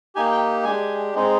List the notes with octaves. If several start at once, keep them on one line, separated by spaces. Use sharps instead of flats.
A#3 D#4 G4 G#5
G5
G#3 D4 G4 G#5
G#3 C4 D#4